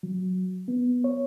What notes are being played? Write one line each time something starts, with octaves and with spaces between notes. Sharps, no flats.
F#3
B3
C#5